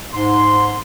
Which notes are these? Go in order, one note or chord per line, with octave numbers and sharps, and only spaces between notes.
G#2 C6